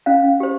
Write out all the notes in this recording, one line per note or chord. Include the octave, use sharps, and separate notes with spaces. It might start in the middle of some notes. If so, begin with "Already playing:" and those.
C#4 F5
G4 C5